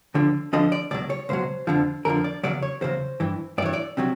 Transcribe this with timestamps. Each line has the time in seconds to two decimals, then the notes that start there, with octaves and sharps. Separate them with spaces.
0.14 D2 D3 F3
0.53 D2 D3 F3 D#5
0.72 D5
0.91 C#2 B2 F#3 D5
1.10 C#5
1.29 C#2 B2 F#3 C5
1.67 F2 D3 F3
2.05 F2 D3 F3 A#4
2.24 D5
2.43 E2 C#3 F#3 D5
2.62 C#5
2.81 E2 C#3 F#3 C5
3.20 G2 E3
3.58 G2 D5
3.62 E3 C#5
3.73 D5
3.97 C3 D#3 F#3